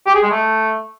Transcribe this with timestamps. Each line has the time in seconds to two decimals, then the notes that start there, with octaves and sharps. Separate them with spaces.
0.06 G4
0.14 G#4
0.23 G#3
0.31 A3